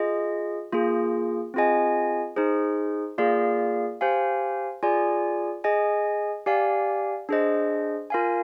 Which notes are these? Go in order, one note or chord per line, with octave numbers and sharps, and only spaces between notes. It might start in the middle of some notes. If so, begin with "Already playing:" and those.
Already playing: F4 G#4 D#5
A#3 F4 G#4
C4 F4 G#4 D#5 G#5
D#4 G#4 C5
A#3 F4 G#4 D5 F5
G4 C5 F5 G#5
F4 G#4 D5 G#5
G#4 D#5 G#5
G4 D5 F5 G#5
D4 G#4 C5 D#5
F4 A#4 F5 G#5